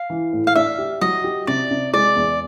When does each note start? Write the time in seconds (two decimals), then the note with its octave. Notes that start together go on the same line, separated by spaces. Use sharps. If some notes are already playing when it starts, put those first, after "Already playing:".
Already playing: F5
0.10 E3
0.33 A2
0.47 F5
0.55 D4 E5
0.78 G4
1.01 F#3 D#5
1.24 G4
1.47 C3 D5
1.71 C3
1.93 G#3 D5
2.16 E2